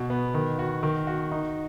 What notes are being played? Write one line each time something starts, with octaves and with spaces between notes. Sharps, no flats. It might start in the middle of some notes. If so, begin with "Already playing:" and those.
Already playing: B2
B3
D#3
F#4
D#3
F#4
D#4